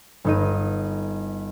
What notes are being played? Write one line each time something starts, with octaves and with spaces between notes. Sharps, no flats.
G1 D#4 D#7